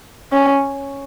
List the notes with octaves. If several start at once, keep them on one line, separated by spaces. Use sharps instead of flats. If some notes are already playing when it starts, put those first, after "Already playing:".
C#4